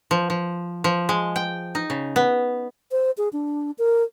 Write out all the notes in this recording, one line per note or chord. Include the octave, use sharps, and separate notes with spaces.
F3
F3
F3
G#3
G5
D#4
C#3
B3
C5
G#4
D4
A#4